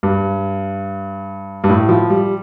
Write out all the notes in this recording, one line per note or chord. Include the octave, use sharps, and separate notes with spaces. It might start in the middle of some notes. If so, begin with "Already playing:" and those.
G2
G2
A2
F3
G3